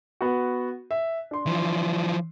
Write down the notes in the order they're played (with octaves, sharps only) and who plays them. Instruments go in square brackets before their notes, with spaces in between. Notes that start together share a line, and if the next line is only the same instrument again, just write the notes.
[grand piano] B3 F#4
E5
D4 C6
[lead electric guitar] E3 F3